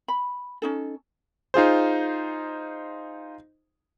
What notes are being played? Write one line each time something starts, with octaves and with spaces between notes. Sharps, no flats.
B5
C#4 D#4 A4
D#4 F4 G#4 C5